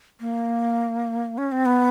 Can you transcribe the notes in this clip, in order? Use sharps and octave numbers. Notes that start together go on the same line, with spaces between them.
A#3
C#4
C4
B3